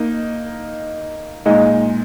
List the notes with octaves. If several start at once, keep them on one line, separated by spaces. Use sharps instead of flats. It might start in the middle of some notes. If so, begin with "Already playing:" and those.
Already playing: A#3 D#4
A#2 G#3 D#4